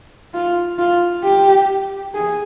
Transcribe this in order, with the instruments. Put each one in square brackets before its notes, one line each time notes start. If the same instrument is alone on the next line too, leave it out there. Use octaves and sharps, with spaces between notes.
[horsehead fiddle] F4
F4
G4
G#4